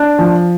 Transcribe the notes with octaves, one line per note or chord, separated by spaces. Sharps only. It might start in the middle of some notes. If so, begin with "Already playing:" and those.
Already playing: D4
F3